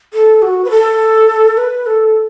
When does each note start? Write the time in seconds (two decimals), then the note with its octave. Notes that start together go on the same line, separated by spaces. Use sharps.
0.14 A4
0.42 F#4
0.65 B4
0.71 A4
1.57 B4
1.86 A4